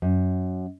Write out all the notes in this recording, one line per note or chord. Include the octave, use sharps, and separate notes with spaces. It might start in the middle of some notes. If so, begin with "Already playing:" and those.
F#2